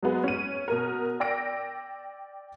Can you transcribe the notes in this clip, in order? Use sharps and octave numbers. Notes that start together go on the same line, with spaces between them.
F#3 G#3 B3 G#4
C#4 D#7
B2 A#4
D5 G5 E6 A#6 D7